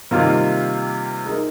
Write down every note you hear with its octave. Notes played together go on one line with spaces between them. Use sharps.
C3 D#3 G3 A#3 F4
G#3 D#4 A#4